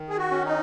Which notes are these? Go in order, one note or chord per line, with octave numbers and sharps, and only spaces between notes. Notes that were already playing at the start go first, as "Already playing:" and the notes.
Already playing: D#3
G#4
F#4
C#4
D#4